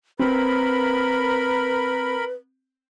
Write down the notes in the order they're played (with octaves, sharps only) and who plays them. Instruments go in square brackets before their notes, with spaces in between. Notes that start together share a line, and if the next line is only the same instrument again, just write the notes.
[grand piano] C4 [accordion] A#4 B5 [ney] B4